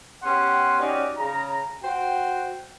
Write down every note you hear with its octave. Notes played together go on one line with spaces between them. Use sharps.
B3 C#4 G4 F#5 C6
C#4 D#4 F#4 G4 D5
C#3 A#5
F#4 C5 G5